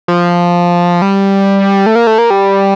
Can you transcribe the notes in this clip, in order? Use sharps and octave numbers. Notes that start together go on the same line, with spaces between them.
F3
G3
A3
A#3
A3
A#3
G3